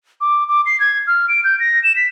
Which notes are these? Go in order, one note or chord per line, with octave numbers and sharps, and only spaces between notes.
D6
D6
C7
G#6
F6
D7
G6
A#6
E7
B6